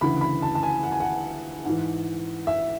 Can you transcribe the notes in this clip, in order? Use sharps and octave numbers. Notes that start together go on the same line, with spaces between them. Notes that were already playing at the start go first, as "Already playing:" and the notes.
D2 C#3 E3 B5
B5
A5
A5
G#5
F#5
G#5
F#5
G#2 E3
E5